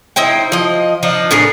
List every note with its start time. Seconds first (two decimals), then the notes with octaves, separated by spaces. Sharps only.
0.16 D#4 E4 C5 G5
0.52 F3 D#5
1.03 F3 D4 D#4
1.31 A2 D4 G#4 A#4